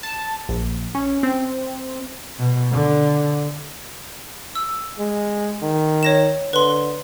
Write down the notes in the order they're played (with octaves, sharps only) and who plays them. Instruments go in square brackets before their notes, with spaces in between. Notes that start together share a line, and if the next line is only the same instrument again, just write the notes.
[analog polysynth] A5
A#1
C#4
C4
[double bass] B2
D3
[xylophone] E6
[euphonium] G#3
D#3
[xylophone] C#5 A#6 E7
[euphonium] D3 [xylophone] B4 C6